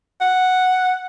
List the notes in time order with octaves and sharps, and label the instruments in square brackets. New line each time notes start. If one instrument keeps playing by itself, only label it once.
[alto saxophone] F#5